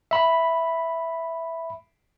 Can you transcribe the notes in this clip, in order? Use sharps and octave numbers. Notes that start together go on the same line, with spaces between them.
E5 B5